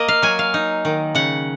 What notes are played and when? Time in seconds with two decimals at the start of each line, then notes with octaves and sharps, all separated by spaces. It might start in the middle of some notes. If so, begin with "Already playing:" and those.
Already playing: A#3 D#5
0.08 F5
0.22 F#3 G#5
0.39 F5
0.54 D#4
0.85 D#3
1.15 C#3 F#5